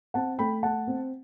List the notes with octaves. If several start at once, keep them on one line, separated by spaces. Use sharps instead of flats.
C4 F#5 A5
A3 G5 B5
A3 F#5 A5
C4